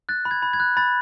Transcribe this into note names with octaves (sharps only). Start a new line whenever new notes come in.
F#6 A6
B5
G#6
B5
G#6
F#6
B5 A6